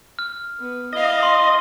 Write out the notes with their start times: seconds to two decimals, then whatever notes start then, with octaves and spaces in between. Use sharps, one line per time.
0.19 F6
0.60 B3
0.93 E4 D#5 F5
1.23 C6